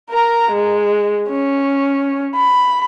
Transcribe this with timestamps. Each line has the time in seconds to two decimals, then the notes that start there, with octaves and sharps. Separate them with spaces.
0.11 A#4 A#5
0.53 G#3
1.29 C#4
2.35 B5